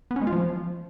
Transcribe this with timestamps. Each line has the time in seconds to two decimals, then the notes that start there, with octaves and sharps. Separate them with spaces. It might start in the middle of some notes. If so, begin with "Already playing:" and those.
0.11 B3
0.16 C#4
0.22 G#3
0.27 F4
0.32 F3